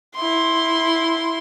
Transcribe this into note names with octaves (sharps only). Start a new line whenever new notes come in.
E4 C6